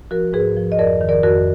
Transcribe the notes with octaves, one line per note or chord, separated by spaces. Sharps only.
F3 F#4 A#4
G#2 G#4 B4
F3
D#5
F2 A#4 D5
D#3
A#4 D5
F2 F#4 A#4